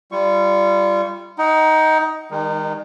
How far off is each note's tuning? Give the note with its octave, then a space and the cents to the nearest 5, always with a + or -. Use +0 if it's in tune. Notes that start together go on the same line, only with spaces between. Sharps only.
G3 +0 F4 -30 C#6 +0
D#4 +15 F#5 +35
D#3 +10 G#3 -45 D#4 -30